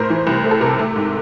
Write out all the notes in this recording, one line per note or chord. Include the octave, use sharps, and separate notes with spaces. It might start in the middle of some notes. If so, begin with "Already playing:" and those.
Already playing: A2 A#4 C5
E3
C2
A3
A4
C3 A#4
A3
G#2